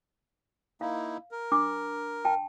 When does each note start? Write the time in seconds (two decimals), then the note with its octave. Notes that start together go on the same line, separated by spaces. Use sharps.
0.81 A#3 D#4 E4 F5
1.31 A#4
1.52 D4 D6
2.25 G5 A5